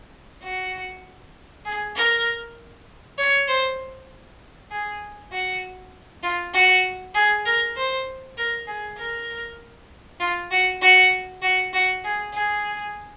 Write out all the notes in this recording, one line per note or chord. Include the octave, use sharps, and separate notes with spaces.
F#4
G#4
A#4
C#5
C5
G#4
F#4
F4
F#4
G#4
A#4
C5
A#4
G#4
A#4
F4
F#4
F#4
F#4
F#4
G#4
G#4